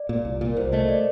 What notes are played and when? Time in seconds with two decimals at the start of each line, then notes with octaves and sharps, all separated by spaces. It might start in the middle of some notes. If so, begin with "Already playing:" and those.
Already playing: D5
0.09 A#2
0.25 C2
0.41 A#2
0.48 A#4
0.57 C2 C5
0.72 A3 D#5
0.89 D5